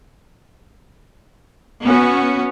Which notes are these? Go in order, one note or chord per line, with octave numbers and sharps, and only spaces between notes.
B3 C#4 F#4